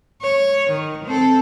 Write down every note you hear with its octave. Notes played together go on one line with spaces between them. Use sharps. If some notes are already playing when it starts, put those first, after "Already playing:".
C#5
D#3
C4 A4